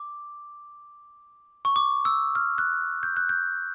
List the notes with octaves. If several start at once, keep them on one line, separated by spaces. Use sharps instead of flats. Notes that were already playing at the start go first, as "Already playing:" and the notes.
Already playing: D6
C#6
D6
E6
F6
F#6
G6
F#6
G6